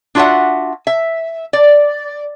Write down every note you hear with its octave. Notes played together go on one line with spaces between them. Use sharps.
D4 F4 F#4 D#5 E5 F#5
E5
D5